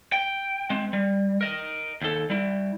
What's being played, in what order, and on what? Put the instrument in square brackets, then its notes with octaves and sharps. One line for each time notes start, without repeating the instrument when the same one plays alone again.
[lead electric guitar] G5
G#3 C4
G3
A#4 D#5
D#2 A4
G3 E4